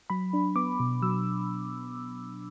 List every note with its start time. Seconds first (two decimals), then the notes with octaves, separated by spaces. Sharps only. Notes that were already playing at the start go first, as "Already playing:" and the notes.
0.10 F#3 B5
0.33 D4
0.56 B3 D6
0.80 B2
1.02 F#3 E6